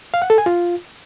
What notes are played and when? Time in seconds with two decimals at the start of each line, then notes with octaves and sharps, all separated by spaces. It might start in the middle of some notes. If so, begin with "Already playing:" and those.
0.14 F5
0.22 F#5
0.30 A4
0.38 G#5
0.46 F4